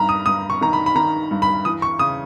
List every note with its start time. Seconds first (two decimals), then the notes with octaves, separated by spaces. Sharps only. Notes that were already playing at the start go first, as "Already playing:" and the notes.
Already playing: G2 D#3 A#5 B5
0.09 D#6
0.26 G2 D#6
0.50 C#6
0.61 D#3 A#5
0.73 B5
0.86 B5
0.95 D#3 A#5
1.31 G2
1.42 B5
1.65 E3 D#6
1.82 C#6
1.99 C#3 D#6